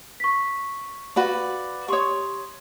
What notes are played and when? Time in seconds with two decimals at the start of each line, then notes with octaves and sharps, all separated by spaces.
0.20 C#6 B6
1.16 F#4 B4 D5 F5 B5
1.88 G4 C#5 C6 C#6 D#6